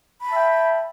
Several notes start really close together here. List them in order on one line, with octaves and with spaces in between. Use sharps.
B5 A5 E5 G5